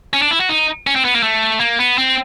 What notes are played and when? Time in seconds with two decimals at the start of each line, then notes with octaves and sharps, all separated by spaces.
0.13 C#4
0.22 D4
0.31 E4
0.40 F#4
0.49 D#4
0.87 C#4
0.96 C4
1.05 B3
1.14 A#3
1.23 A3
1.60 A#3
1.79 B3
1.98 C4